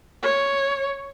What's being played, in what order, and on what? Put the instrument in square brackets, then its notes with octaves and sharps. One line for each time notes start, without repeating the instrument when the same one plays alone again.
[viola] C#5